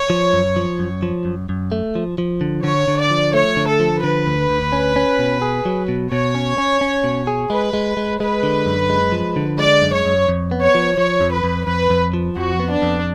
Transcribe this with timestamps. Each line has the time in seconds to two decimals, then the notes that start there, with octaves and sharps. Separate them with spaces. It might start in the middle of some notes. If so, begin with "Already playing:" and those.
Already playing: C#5
0.10 F3
0.33 F#2
0.56 F3
0.79 F#2
1.03 F3
1.25 F#2
1.49 F#2
1.72 A3
1.95 F3
2.18 F3
2.41 D3
2.64 D3 C#5
2.88 D3
2.99 D5
3.10 F3
3.34 A3 C#5
3.57 D3
3.69 A4
3.80 F3
4.03 D3 B4
4.26 D2
4.49 D2
4.72 C#4
4.96 C#4
5.19 B2
5.42 G#4
5.65 F#3
5.88 B2
6.11 B2 C#5
6.35 C#4
6.58 C#4
6.81 C#4
7.04 B2
7.27 G#4
7.50 G#3 B4
7.73 G#3
7.97 G#3
8.20 G#3 B4
8.43 D3
8.66 F#2
8.90 G#3
9.12 F3
9.36 D3
9.58 G#3 D5
9.82 F#2
9.93 C#5
10.06 F#2
10.28 F2
10.51 B3
10.63 C#5
10.75 F3
10.98 F3 C#5
11.21 F2
11.32 B4
11.44 F2
11.67 F2 B4
11.90 F2
12.14 F3
12.36 F2 F#4
12.60 B3
12.71 D4
12.82 F2